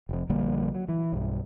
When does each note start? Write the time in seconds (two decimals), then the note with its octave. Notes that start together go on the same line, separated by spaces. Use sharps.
0.09 F1 F2
0.30 A#1 D3 G3 A#3
0.75 F#3
0.89 E3
1.12 B1 G2